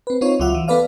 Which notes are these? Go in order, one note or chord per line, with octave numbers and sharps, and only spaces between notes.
C4 B4
C4 D#4 F4 C#5
C#2 F#3 F4 E5 F#5
E3
B3 A4 B4 D5 F5